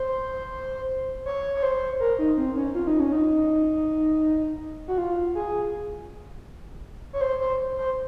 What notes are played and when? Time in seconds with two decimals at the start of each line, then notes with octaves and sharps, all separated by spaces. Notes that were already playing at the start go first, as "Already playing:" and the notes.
Already playing: C5
1.25 C#5
1.55 C#5
1.63 C5
2.00 A#4
2.19 D#4
2.37 C4
2.56 C#4
2.75 F4
2.87 D#4
3.00 C#4
3.12 D#4
4.88 F#4
4.98 F4
5.35 G#4
7.13 C#5
7.21 C5
7.40 C5
7.77 C5